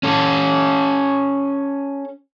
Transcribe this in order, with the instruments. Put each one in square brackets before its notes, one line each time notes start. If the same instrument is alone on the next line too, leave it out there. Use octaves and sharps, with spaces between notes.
[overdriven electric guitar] C#4 A4